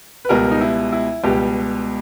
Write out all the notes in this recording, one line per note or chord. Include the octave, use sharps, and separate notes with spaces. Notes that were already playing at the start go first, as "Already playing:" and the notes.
B4
C#2 B2 G3 A#4
D#4
E4
E4
C#2 B2 G3 G4